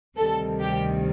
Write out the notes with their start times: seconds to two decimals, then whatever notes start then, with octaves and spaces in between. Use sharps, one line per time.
0.17 D2 C3 D#3 G3 A4
0.61 G4